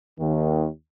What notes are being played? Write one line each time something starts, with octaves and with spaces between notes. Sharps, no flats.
D#2 D#3